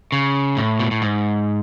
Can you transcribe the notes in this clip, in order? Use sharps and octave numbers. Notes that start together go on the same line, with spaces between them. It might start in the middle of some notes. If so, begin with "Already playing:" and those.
C#3
A2
B2
A2
G#2